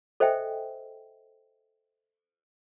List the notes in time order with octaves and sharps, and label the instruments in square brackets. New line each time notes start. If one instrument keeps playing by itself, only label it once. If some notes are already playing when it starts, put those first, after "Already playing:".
[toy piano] A4 C5 D#5 E5 G5 G#5